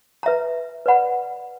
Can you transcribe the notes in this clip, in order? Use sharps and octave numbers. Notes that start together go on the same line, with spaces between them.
B4 E5 A#5
B4 D5 F#5 B5